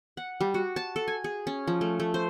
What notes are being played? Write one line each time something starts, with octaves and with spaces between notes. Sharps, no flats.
F#5
G3
F#4
A5
A4
G#5
G#4
C#4
F3
A3
A3
C5